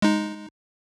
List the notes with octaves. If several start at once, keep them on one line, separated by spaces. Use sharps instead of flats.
G#3 D#4